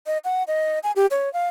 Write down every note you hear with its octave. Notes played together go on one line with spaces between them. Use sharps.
D#5
F#5
D#5
G#5
G4
C#5
F5